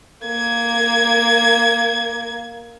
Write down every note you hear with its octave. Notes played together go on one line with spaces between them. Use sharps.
A#3 G#6